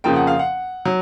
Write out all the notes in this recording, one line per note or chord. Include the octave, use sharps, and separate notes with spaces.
F2 C#3 F3 A#3 G5
F#5
F5
F#5
F#3